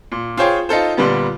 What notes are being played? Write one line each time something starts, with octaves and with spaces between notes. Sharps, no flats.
A#2
F4 G#4 C5 C#5 G5
D#4 F4 A4 C5
A#2 D3 G3 B3